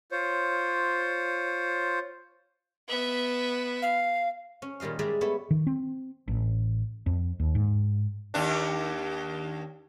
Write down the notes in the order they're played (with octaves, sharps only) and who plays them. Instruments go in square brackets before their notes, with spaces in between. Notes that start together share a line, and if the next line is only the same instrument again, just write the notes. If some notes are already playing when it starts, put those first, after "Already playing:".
[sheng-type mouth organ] F4 C5 C#5
[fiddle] B3 E5
[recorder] F5
[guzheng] C#4
A#2 D#3 G3 D#5 F5
G3 G#3 G#4 D5 E5 A#5
A3 B3 A4 C#5 E5
[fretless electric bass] D#3
C4
A1
F2
D#2
G#2
[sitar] D#2 D4